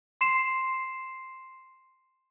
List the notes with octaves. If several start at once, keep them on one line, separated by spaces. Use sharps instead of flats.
C6 C7 E7